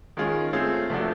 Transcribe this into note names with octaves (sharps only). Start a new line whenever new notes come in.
D#3 G#3 C#4 F4 G#4
A3 C4 F4 G#4 C#5
C3 F3 A3 D4 F#4